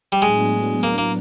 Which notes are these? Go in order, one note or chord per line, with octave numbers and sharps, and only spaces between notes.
G3
A2 F#3 G#3 B3 D4
A#3
A#3